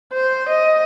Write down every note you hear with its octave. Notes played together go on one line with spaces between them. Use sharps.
C5
D#5